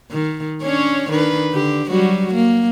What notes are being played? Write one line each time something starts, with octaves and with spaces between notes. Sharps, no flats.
D#3
C#4 D4 C#5
D#3 D4 B4
D3 G4
F#3 G3 F#4
A#3